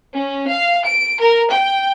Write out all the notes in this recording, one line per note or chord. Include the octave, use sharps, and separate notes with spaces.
C#4
F5
D7
A#4
G5